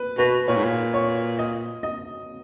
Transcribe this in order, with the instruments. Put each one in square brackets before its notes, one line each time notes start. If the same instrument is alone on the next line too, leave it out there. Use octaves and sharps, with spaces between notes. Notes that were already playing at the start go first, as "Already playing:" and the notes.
Already playing: [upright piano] B4
[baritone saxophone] B2 [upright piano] B4
[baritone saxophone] A#2 [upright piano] C#5
[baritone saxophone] G#2
A#2
[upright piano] C#5
D#5
D#5